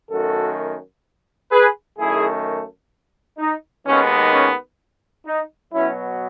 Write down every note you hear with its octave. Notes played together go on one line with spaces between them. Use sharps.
F#2 D#3 A3 F#4 A4
G#4 B4
F#2 D#3 A3 E4 G#4
D#4
D#2 D#3 G#3 B3 C#4
C#4
D#4
B2 F#3 B3 C#4 E4